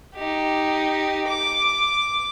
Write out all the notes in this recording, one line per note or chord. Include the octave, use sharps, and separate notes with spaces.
D#4 G4
D6